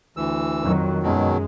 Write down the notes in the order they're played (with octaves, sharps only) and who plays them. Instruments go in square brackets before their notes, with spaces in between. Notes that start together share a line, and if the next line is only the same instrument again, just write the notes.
[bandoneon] D2 E3 E6
[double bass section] F2 D#3 F#3
[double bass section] F#2 G#3 [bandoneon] B2 D#3 F#3